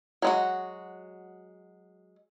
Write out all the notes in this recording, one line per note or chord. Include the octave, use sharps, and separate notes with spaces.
F#3 G#3 F#4